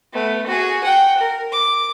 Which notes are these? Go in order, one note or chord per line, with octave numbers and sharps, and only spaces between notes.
A3 B3
F#4 G#4
F#5 G5
A#4
D6